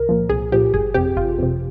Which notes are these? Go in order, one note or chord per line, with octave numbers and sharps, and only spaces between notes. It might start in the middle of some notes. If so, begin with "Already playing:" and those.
Already playing: C2 A#4
A#2 F3
C2 G#4
A#2 F3 G4
G1 G#4
F2 C3 G4
G1 F4
F2 C3